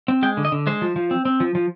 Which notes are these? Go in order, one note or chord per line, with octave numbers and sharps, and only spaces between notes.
C4
G#3 G5
D3
D#5
D3
G#3 C5
F3
F3
C4
C4
F3
F3